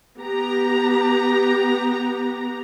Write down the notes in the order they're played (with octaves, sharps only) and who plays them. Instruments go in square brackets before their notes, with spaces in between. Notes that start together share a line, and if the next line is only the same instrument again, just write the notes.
[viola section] B3 G4 A#5